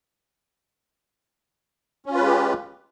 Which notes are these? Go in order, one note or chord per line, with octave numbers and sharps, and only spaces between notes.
G#3 C#4 F4 G4 B4